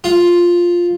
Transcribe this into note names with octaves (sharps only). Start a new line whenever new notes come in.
F4